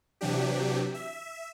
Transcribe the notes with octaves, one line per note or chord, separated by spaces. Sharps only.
C3 E3 F#3 D4 G4
E5